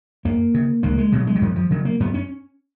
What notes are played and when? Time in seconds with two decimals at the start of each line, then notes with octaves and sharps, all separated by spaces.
0.25 F#2 A#3
0.54 C#3
0.83 C#2 A#3
0.98 G#3
1.12 B2 F#3
1.27 G#3
1.35 F#3
1.42 F#2 F3
1.56 F3
1.71 C#3 F#3
1.85 A#3
2.00 F#2 B3
2.14 C#4